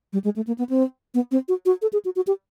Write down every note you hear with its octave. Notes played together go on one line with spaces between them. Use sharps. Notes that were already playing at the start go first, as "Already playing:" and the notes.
G3
G#3
A3
A#3
B3
C4
B3
C4
F#4
F#4
A4
G#4
F#4
F#4
G4